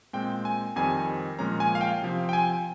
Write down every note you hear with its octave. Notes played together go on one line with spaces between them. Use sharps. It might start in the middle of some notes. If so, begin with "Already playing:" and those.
A#2 G#3 C4 G5
G#5
F2 D#3 G3 C4 G#5
A#2 F3 G#3 C#4 A#5
G#5
F5
G5
C3 F3 C4
G5
G#5